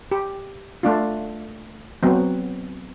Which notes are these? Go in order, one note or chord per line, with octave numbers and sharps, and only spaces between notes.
G4
A3 D4 F4
F#3 B3 C4